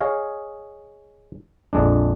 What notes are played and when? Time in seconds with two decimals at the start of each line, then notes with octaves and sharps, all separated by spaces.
0.01 G#4 C#5 D#5 F5
1.73 A#1 F2 G#3 D4